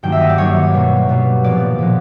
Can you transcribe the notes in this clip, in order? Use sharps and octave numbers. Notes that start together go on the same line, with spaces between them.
G2 D#3 F#3 A#3 G5
E5
D#5
D5
G2 D#3 F#3 A#3 C#5
B2 G3 A#3
B2 G3 A#3
A#2 F3 G#3 B3 D5
A#2 F3 G#3 B3